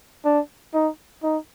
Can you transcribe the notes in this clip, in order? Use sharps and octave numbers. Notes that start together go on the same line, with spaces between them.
D4
D#4
D#4